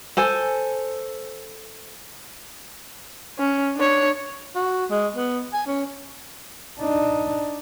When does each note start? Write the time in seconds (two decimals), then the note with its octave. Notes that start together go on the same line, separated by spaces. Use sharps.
0.17 A4 C5 G#5
3.38 C#4
3.76 D4 C#5
4.55 F#4
4.91 G#3
5.16 B3
5.54 G#5
5.67 C#4
6.80 D4 D#4